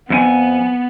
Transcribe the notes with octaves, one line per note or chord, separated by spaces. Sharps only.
F2 B3 E4 G#5